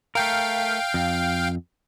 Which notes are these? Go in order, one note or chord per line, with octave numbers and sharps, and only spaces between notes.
A3 A#4 F5 G5
F2